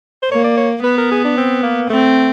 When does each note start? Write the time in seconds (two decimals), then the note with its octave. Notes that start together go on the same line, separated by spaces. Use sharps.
0.23 C5
0.31 A#3 C#5
0.44 D5
0.57 C#5
0.84 B3 B4
0.98 A#4
1.11 G#4
1.24 D4
1.37 C4
1.63 A#3
1.90 A3 C4